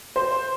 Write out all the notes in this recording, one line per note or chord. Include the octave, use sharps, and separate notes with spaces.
C5